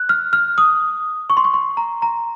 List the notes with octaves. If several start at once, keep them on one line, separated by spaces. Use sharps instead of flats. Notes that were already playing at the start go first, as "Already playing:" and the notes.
Already playing: F#6
F6
F6
D#6
C#6
C6
C#6
C6
A#5
A#5